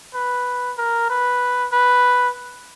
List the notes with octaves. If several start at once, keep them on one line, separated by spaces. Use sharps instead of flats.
B4
A#4
B4
B4